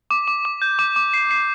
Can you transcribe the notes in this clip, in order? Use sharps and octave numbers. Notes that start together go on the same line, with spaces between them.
D6
D6
D6
G6
D6
D6
C7
C7